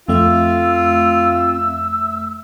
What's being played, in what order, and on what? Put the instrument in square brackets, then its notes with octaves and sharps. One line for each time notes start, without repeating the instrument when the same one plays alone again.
[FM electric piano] F2 A3 E5 [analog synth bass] C4 [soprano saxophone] F4 [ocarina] E6